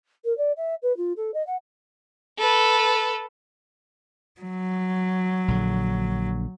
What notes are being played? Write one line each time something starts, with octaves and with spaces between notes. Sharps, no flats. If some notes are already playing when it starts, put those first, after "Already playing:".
A#4
D5
E5
B4
F4
A4
D#5
F#5
A4 B4
F#3
A#1 D3